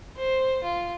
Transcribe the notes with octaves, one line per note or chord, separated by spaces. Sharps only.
C5
F4